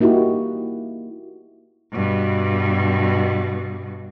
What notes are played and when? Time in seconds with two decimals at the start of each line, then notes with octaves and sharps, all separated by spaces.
0.01 A#3 D#4 E4 F#4 G4
1.92 G2 B2